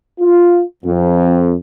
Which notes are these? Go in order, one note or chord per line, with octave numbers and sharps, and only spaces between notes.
F4
F2